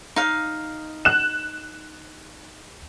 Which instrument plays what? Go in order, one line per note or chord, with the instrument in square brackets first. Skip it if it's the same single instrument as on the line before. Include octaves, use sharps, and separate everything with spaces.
[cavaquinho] D#4 F5
[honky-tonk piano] F#6 E7